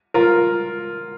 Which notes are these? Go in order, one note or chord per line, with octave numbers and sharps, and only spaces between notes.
F4 A#4